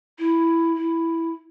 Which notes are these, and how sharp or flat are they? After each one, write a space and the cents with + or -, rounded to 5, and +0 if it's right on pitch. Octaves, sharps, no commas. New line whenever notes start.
E4 +5
E4 +0